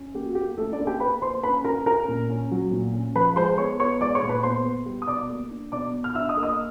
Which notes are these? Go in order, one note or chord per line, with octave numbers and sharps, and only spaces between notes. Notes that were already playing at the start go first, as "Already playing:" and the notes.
Already playing: C#4
A#3 G4
F#4
A#3 G4
A3 C#4 A4
D4 D5
A#3
G4 G5
A#3 B4 B5
A#3 C5 C6
C#4 B4 B5
C#4 A#4 A#5
C#4 A#4 A#5
A#2
C#4
F#3
A#2
C#4
F3 B4 B5
G#3 C5 C6
B3 C#5 C#6
B3 C#5 C#6
G#3 D5 D6
C#5 C#6
A#2
B4 B5
B3 C5 C6
B3
G3
D#6
B2 D5 D6
A#3
D4
B2 D5 D6
B2
F6
D4 E5 E6
D#5 D#6
A#3
D#5 D#6